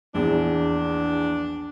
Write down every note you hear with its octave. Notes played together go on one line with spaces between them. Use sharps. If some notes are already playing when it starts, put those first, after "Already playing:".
A#1 E2 D4